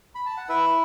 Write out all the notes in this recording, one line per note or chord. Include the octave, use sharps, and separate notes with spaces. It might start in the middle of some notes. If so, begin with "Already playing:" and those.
B5
A5
F#5
E4 B4 E5